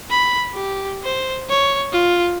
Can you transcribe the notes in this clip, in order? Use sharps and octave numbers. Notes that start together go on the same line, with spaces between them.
B5
G4
C5
C#5
F4